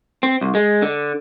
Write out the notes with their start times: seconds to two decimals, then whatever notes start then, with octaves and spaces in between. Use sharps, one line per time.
0.23 C4
0.41 C2
0.55 G#3
0.82 D3